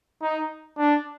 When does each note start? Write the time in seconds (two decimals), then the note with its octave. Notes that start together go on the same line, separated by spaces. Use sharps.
0.22 D#4
0.78 D4